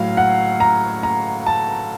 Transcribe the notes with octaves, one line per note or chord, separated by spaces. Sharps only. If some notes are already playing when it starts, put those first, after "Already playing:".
Already playing: A2 F#3 F5
F#5
A#5
A#5
A5